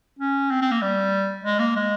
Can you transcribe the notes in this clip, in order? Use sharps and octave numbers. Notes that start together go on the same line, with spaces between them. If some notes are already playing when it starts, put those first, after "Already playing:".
C#4
C4
C4
A#3
G3
G#3
A#3
G#3